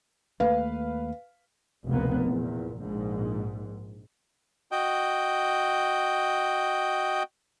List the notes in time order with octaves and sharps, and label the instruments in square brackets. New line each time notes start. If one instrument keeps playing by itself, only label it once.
[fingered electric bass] D#2 A3 A#3 [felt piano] B4 F5
[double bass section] F1 C#2 B2 A#3 B3
E2 A#2
A#1 G#2
[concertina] F#4 D#5 G5